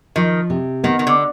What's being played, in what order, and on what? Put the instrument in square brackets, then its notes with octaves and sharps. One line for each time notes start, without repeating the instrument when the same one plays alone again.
[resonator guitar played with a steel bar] D#3 [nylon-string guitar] F3
[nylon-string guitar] C3
[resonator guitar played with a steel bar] D#3 [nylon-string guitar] B3
[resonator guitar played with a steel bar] D#3
D3